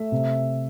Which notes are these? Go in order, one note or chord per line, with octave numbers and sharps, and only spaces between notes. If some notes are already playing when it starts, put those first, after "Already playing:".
Already playing: A3 E5
C3